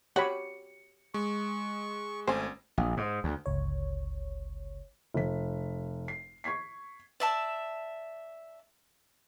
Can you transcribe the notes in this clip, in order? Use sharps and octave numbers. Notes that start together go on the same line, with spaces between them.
F#4 G4 C#5 B5 C#7
G#3 C#6
G#1 A3 C#4 C5 G#5
A#1
G#2
D2
G1 C#2 C#5
F1 B6
C7
C#6 G#6 B6 C7
D5 E5 A5